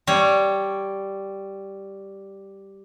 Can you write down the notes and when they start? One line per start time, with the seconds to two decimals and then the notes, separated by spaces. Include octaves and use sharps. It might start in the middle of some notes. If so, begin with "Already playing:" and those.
0.07 G3 C#5